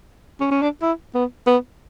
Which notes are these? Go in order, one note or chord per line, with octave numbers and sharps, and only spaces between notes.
C#4
C#4
D4
E4
B3
B3